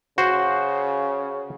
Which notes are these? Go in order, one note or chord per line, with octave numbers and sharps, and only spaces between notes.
C#3 F#4 C5